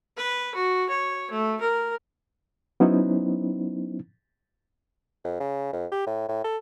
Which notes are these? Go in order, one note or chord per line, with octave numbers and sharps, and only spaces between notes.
B4
F#4
C#5
A3
A#4
F#3 B3 C#4 D#4 E4 C5
F2
C#3
F2
G4
A2
A2
A4